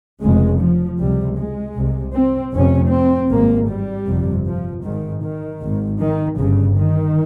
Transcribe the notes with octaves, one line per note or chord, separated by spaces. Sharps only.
F1 F2 C#3 G#3
F3
C#2 C3 G3
G#3
C2 C3
C4
F1 F2 C3 C#4
C4
G#1 G2 A#3
G3
G1 F2 C3
F3
G#1 G#2 D#3
D#3
G#1 G#2
D#3
G1 G2 C#3
D#3